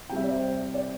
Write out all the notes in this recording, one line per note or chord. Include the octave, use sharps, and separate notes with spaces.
C3 G3 E5 G5
D5
C5 E5
D5